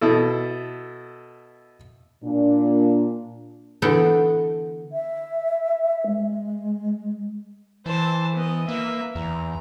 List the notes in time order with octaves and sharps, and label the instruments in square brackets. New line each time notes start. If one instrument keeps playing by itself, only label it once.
[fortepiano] B2 E4 A4
[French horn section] A#2 D4
[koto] D3 E3 B3 A4 F#5 G5
[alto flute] E5
G#3
[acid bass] E3 [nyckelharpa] C5 A5
[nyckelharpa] B3 D#5
[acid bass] A#3 [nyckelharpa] B4 E5
[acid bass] E2 [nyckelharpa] A#5